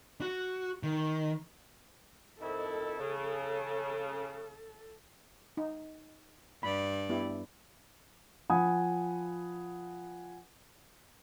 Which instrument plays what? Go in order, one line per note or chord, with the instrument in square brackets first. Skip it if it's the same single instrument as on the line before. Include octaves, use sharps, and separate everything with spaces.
[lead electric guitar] F#4
D#3
[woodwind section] F2 D#3 E4 [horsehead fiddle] A4
[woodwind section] C#3
[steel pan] D#4
[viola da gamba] G2 D5 [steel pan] B5
[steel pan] B3 E4 G4
[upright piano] F3 F#5 G#5 B5 D#6